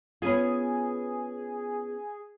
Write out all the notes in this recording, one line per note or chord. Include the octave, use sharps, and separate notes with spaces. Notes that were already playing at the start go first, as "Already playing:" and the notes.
B3 C#4 F4 G#4